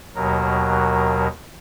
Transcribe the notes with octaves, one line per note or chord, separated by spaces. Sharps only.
D#2 B2 F#3 A#4